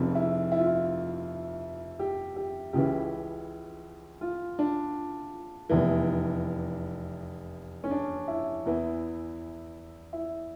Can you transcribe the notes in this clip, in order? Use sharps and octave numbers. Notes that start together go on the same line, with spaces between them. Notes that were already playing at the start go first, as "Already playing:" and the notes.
Already playing: F1 F2 C#3
E4
E4
F4
E4
G4
G4
C#2 C#3 E3 G4
F4
D4
F1 E2 E3
C#4
D4
E4
E2 E3
E4